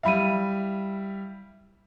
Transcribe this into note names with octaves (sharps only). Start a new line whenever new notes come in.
G3 E4 E5 F5 B5 D#7